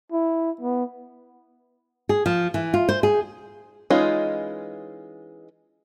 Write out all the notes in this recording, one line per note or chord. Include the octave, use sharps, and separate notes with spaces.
E4
B3
G#4
F3
E3
F4
C5
G#4
E3 G#3 C#4 D#4 F4